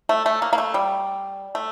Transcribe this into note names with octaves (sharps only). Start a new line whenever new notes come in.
A3
A3
A#3
A#3
A3
G3
A3